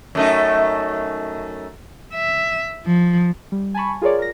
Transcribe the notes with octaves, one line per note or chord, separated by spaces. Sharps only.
F#2 A3 D#4
E5
F3
G3
G#5 A5 B5 C#6
F4 G#4 A#4 C#5 D5
A#4 A#6